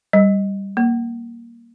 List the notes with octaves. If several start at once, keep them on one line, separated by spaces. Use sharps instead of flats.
G3
A#3